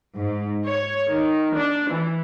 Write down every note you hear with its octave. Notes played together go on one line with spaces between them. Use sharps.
G#2
C#5
D#3
D4
E3